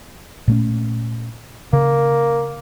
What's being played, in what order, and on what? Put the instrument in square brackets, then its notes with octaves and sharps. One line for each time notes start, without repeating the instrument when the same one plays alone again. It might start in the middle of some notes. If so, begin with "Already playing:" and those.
[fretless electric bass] A#2 A3 C#4
[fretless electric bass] C#3 [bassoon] A#3